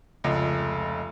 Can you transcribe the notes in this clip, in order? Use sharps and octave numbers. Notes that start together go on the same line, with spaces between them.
F1 C#2